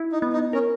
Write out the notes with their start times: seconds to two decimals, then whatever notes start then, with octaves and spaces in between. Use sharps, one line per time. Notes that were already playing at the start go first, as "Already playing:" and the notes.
Already playing: E4
0.12 D#4
0.22 B3
0.33 D#4
0.53 C#4 A#4